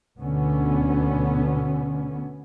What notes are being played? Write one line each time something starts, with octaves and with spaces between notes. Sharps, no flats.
D2 B2 D3 B3 C#4